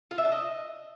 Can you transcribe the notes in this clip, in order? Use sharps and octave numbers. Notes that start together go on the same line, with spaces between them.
F4
E5
D4
D#5